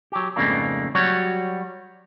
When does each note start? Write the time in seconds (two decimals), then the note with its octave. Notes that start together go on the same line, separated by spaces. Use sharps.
0.12 F#3 G4
0.36 F2 G#2 C#3 A3 A#3 D4
0.95 F#3 G3 F#4 C#5